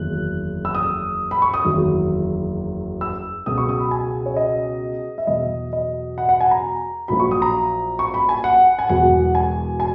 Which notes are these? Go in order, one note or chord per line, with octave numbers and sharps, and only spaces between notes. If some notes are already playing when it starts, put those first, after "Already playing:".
Already playing: F#1 E2 D#3 F#3 F#6
E6
D#6
B5
C#6
D#6
F#1 E2 D#3 F#3
E6
C#2 B2 F#3 D#6
C#6
D#6
B5
G#5
C#5
D#5
E5
E2 B2 F#3 D#5
D#5
F#5
F#5
G#5
A#5
A#1 A#2 F#3 B5
C#6
D#6
A#5
C#6
B5
G#5
F#5
G#5
E1 E2 B2 F#3 F#5
G#5
G#5